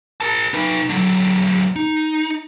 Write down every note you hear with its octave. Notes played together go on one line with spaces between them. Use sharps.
A#4 A5
D#4 B4
D3 F#3
D#4